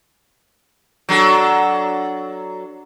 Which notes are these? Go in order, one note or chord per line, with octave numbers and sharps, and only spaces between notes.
F#3 D4 A4